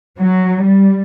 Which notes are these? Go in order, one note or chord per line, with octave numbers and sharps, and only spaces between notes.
F#3
G3